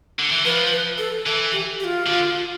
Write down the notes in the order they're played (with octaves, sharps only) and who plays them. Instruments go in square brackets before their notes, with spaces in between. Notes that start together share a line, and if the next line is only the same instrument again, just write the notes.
[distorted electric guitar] D3
E3
[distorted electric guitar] F3 [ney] B4
[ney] B4
A4
[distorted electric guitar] E3 [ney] A4
[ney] G4
G4
F4
[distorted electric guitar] D3